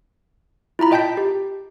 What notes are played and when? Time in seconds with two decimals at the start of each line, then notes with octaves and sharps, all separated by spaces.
0.79 E4 F4 A#5 B5
0.91 F4 D#5 G5 A5 G6 B6
1.17 G4